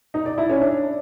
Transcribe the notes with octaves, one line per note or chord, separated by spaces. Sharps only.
D#4
D5
E4
C#4
D4